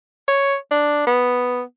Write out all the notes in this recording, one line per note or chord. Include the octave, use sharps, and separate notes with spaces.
C#5
D4
B3